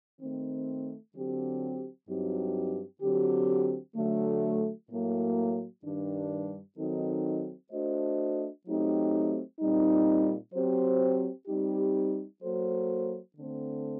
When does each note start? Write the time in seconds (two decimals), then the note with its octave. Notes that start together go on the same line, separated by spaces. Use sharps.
0.19 D#3 A3 C4
1.14 D3 F#3 C4 G4
2.07 G2 F#3 C4 D#4 G4
3.02 D3 F#3 C4 G4
3.95 D3 F#3 A3
4.90 A2 F#3 A#3
5.84 G2 D#3 G3 D4
6.78 D#3 F#3 C4 D#4 A4
7.72 A3 D4 F#4 C5 D#5
8.66 F#3 A3 C4 D#4 G4
9.60 A#2 G3 C4 D#4
10.54 F#3 C4 G4 C5
11.47 G3 C4 D#4 G4
12.42 F#3 A#3 F#4 A4 C5
13.35 D3 A3 C4